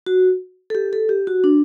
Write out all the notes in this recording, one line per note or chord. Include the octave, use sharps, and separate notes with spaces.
F#4
A4
G4
A4
G4
F#4
D4